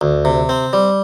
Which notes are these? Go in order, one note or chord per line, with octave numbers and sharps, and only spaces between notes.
D2
C3
C4
G3